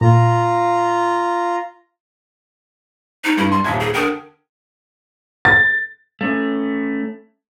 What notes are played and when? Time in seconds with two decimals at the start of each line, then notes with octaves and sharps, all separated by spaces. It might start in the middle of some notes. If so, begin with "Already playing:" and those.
0.01 A#2 F4 A#5
3.24 D#4
3.37 G2 E4
3.52 G3 C6
3.64 D#1 D#2 E5 G#6
3.80 G#4
3.94 D3 A#4 G5 D#6
5.45 A6
6.21 A3 C#4